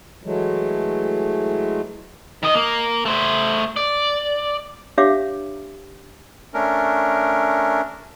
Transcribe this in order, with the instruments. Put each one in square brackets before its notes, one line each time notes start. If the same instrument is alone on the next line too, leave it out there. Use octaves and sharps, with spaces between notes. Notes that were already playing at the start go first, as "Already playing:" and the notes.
[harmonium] E3 F#3 G#3 A3
[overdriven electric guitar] D#3 D#5
A#3
A3 C5
D5
[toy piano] D4 G4 C#5 E5 F5 D6
[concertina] A3 C#4 D4 A#4